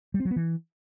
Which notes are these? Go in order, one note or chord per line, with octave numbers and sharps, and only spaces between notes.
G3
C4
F#3
B3
E3